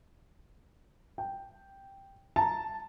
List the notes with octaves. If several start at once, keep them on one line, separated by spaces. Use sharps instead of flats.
G5
A5 A#5